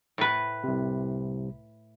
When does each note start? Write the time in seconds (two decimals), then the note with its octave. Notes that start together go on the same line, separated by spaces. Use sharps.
0.18 A2 B4
0.64 C2 C3